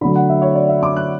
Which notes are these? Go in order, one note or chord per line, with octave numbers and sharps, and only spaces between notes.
D3 F#3 A3 B5
F#5
E5
C#5
D5
E5
D6
F#6